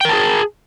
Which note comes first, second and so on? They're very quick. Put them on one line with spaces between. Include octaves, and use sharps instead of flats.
G5 A#4 A5 G#4